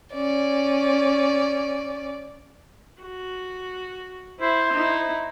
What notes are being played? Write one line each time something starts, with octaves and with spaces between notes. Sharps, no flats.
C#4 D5
F#4
E4 C5
D#4 E4